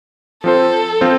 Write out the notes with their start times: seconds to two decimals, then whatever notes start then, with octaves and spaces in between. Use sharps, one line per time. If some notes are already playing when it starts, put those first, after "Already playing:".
0.44 F3 C4 F4 A4 C5
1.01 F3 C4 F4 C5